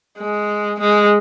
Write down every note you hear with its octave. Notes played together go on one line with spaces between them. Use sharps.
G#3
G#3